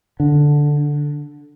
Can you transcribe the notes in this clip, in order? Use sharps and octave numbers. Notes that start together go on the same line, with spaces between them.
D3